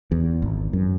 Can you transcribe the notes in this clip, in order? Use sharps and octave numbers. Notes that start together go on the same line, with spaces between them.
E2
G#1
F#2